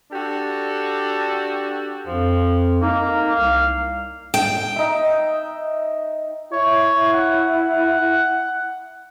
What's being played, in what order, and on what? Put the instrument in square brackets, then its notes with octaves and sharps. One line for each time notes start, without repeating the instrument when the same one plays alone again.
[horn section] D4 F#4 G4 A4
[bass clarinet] F2 [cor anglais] F3
[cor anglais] A#3 [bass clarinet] D#4
[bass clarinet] C2 [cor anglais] F5
[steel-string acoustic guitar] G5
[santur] D#4 E5
[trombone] E4 [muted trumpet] C#5
[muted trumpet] F#5